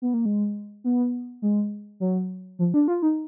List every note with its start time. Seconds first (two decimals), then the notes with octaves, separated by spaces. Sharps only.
0.02 B3
0.14 A#3
0.26 G#3
0.84 B3
1.42 G#3
2.00 F#3
2.59 F3
2.74 D4
2.88 F4
3.02 D#4